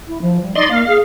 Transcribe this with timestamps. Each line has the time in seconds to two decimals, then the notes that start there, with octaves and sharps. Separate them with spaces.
0.07 E4
0.21 F3
0.41 G3
0.55 D#4 D5 D#5 C6
0.70 A#3 F5
0.87 G#4